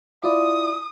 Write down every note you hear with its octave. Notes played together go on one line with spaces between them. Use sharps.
E4 F4 D5 D#6